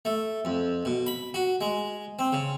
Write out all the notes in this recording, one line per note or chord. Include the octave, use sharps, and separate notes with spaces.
A3
F2
B2
B5
F#4
G#3
C4
C#3